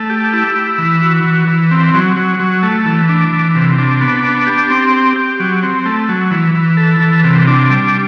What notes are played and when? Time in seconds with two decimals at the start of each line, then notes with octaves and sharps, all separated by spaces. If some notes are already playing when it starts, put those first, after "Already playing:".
Already playing: A3
0.10 G4
0.33 E4
0.55 E4
0.78 E3
1.02 F#4
1.24 E3
1.47 E3
1.71 C4
1.94 F#3
2.16 F#3
2.40 F#3
2.63 A3
2.86 E3
3.09 D4
3.33 E3
3.55 C3
3.78 D4
4.01 B3
4.24 D4
4.47 G4
4.70 C4
4.93 G4
5.16 G4
5.40 F#3
5.63 C4
5.85 A3
6.09 F#3
6.31 E3
6.55 E3
6.77 A4
7.00 E3
7.24 C3
7.47 D4
7.70 G3